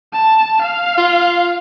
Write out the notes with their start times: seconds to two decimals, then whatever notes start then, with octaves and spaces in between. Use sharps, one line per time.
0.13 A5
0.62 F5
0.98 F4